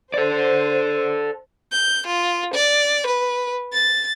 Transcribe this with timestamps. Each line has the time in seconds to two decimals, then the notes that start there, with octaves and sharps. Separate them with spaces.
0.14 A4 C5 D5
1.72 G6
2.06 F4
2.53 D5
3.06 B4
3.73 A6